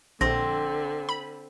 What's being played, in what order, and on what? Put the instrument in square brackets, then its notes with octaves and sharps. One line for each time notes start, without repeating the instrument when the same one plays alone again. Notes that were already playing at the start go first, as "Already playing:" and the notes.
[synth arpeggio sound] A#1 [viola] D3 [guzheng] C4 [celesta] A#6
[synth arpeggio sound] B5